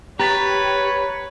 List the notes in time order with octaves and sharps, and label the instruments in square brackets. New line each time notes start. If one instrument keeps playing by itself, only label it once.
[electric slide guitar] G4 [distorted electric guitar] B4 [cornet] C#5 [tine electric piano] A#5 A6 B6